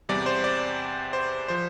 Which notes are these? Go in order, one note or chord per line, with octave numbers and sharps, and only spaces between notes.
E2 C3 G3 D5
C5
D5
C5
F3 C5